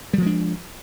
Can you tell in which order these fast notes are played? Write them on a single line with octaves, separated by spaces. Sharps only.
G3 F3 G#3 D4